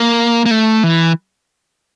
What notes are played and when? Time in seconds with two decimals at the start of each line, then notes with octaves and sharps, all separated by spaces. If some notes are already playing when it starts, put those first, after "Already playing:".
Already playing: A#3
0.46 A#3
0.51 A3
0.83 E3